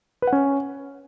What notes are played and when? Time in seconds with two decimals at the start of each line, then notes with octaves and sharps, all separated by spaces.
0.22 B4
0.27 F#5
0.33 C#4